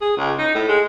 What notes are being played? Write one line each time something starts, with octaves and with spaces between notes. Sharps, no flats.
G#4
C#2
D#4
A2
G#3